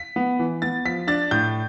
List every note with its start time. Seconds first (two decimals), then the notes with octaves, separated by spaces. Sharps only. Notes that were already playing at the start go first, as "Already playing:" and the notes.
Already playing: B6
0.16 B3
0.39 E3
0.62 B3 A6
0.85 F3 B6
1.07 D4 A6
1.31 A2 G6